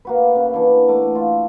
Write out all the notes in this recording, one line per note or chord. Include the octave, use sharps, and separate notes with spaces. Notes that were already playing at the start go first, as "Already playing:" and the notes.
A#3 F#4 B4
E5
C#3
E3 D4
A3 F#5 D6
F4